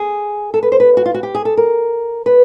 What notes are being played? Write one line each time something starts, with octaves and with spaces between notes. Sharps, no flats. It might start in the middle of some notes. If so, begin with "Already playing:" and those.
Already playing: G#4
A4
B4
C5
B4
F#4
F4
F#4
G4
G#4
A4
A#4
B4